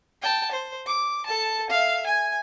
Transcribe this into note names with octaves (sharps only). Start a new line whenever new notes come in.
G5 A5
C5
D6
A4 A5
E5 F5
G#5